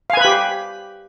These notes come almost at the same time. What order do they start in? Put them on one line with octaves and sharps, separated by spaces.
F5 G#5 B4 B5 G4